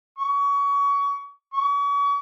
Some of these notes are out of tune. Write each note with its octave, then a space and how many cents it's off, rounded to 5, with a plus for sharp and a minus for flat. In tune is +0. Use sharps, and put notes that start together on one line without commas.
C#6 +30
C#6 +40